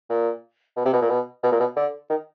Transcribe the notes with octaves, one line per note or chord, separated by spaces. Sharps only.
A#2
B2
C3
B2
A#2
B2
B2
A#2
B2
D3
D#3